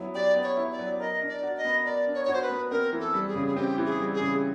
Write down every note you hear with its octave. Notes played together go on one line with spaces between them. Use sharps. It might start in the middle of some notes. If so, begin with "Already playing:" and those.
Already playing: F#3 B3 E4
G4 D5
B3
C#5
E4
D5
F#3
A#4 D#5
D4
D5
F#4
D#5
B3
A#4 D5
D4
C#5
F#4 C#5
C5
B4
B3
C4 A#4
E3
A4
G3
G#4
C#3
G#4
C4 G4
E3
G#4
G3
G#4
C#3